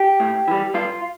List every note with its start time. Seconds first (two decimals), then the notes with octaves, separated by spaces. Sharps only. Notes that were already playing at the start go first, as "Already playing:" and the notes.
Already playing: G4
0.20 A2
0.48 E3 G3
0.74 G2 F4